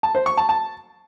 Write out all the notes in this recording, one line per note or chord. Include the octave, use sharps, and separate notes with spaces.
A5
C5
C#6
A5
A5